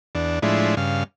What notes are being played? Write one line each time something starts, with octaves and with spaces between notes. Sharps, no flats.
E2 D4
A2 F3 G#3 D4 E4
G2 C#3 F5